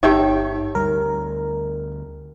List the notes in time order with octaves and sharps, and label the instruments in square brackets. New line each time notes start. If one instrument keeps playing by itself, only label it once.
[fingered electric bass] G1 [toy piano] D#4 G4 [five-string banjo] C#5 E5 G5
[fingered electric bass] D2 G3 [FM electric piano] A#4